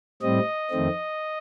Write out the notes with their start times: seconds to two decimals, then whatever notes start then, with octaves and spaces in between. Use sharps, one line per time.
0.22 A2 G3 C4 D#5
0.71 F2 D#3 A3 C4